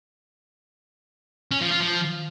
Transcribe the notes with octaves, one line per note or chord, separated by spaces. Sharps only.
C#4
F3
F4
F3